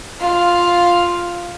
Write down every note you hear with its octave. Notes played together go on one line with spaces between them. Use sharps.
F4 F5